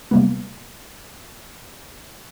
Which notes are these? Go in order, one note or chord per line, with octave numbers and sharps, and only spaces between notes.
C3 G3 A#3 B3